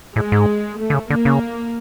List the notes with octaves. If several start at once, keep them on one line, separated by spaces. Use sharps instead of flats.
A2 G#3
G#2
A3
D3
C#3
D3 A#3
C#3